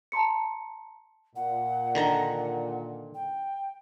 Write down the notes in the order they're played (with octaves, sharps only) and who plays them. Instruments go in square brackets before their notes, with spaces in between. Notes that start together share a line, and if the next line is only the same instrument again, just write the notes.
[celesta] A5 A#5 C6 C#7
[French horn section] A#2 [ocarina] F#5
[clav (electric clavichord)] D3 D#3 A#5
[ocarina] G5